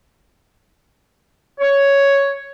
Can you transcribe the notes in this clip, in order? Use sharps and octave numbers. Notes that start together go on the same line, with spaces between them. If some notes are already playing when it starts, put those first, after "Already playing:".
C#5